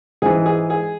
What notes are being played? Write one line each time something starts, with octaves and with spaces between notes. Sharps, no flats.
G#2 E3 G#4
G#4
G#4